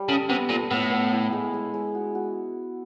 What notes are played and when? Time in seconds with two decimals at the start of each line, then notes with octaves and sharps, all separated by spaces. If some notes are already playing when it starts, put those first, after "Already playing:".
Already playing: G3 D4
0.08 C#3 A4
0.29 C3 B3
0.49 A#2 A4
0.71 A2 B3
0.91 B3
1.12 E4
1.32 G#3
1.54 G#3
1.74 G#3
1.95 F#4
2.15 F#4